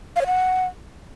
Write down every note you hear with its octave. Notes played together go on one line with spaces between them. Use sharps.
F5
C#5
F#5